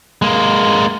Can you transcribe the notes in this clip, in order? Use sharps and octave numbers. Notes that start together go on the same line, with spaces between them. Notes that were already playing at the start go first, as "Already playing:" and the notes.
G#3 A#3